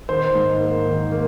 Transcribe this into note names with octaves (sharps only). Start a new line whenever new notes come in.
D#3 C5
G#2
A#3
D#3
A#3